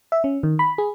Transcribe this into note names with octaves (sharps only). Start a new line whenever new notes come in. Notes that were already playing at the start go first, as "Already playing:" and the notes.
E5
C#4
D#3
B5
G#4